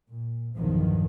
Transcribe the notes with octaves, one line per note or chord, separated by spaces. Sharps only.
A#2
B1 E2 G2 D#3 F3